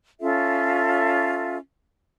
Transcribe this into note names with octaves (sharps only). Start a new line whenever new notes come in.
C#4 F4 A4 E5